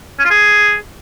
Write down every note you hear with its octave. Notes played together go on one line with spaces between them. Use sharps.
C#4
F4
G#4